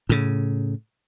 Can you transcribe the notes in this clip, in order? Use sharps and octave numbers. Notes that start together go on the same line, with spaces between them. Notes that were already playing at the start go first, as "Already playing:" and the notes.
A2 C#3